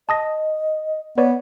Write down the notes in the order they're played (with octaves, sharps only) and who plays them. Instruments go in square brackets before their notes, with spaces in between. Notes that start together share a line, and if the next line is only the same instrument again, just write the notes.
[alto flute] D#5 [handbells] A5 D#6 A#6
[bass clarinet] B3 [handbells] B4 C#5 D5 [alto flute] F#5